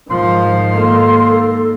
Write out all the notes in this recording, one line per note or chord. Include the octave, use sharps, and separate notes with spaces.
G#2 D#3 F3 C6
A#3 A4